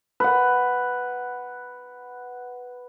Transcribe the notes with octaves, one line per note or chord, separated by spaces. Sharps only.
B4 F#5